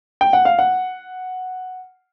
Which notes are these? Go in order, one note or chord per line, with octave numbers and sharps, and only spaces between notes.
G5
F#5
F5
F#5